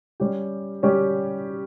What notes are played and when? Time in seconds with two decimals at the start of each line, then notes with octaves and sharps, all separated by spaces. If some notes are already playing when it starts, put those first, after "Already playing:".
0.20 G3 C#4 G4
0.83 G3 C#4 G4